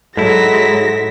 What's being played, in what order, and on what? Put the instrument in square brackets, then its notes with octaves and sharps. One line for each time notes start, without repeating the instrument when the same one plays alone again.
[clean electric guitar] G#2 E4 [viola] F#3 G#3 [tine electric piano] A4 [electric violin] A#6 B6